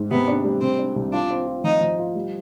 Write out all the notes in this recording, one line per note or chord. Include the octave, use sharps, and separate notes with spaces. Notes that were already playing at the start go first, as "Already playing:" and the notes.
Already playing: G#2
C3 B3
D4
G3
C3 C4
D4
C2
D4 F4
C4
F4
F3 D#4
F3
F4
G3